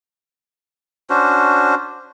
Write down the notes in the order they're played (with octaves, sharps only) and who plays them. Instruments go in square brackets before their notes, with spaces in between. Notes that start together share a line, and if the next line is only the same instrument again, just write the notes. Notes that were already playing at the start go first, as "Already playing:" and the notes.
[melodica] C#4 D4 F#4 C5